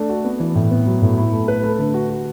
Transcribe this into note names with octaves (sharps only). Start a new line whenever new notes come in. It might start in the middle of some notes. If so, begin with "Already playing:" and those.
Already playing: A3 D4
F#4
B3
E3
A2
B3
F#3
A2
E4
A3
B4
A3
D3
F#4
F#4